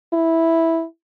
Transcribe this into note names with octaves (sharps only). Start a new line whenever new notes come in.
E4